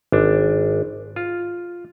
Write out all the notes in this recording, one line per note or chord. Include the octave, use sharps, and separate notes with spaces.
G#1 D4
F4